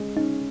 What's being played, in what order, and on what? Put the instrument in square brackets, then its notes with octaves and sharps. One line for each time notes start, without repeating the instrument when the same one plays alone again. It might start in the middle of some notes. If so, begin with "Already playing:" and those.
Already playing: [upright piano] G#3 C#4
[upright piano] C#4 [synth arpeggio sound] D#4